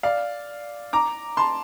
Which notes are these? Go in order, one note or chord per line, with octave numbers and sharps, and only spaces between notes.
D5 F5
A#5 D6
A5 C6